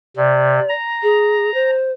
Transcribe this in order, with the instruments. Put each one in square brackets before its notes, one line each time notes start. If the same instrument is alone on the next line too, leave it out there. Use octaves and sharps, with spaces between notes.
[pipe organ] C3 [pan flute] D5
[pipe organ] A#5
[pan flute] G#4
C5